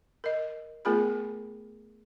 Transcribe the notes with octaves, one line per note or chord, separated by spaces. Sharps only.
A#4 D#5
A3 B3 F4 G#4 A#4 B5